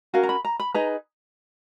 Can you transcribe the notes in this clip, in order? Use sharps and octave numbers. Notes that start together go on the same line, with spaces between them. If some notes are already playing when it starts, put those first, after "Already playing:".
C#4 F#4 A#4 F5
A#5
B5
A#5
B5
D#4 G#4 B4 A#5